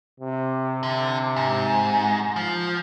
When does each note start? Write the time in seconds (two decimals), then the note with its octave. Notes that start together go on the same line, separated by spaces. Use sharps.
0.20 C3
0.83 D3
1.36 G#2
2.36 F3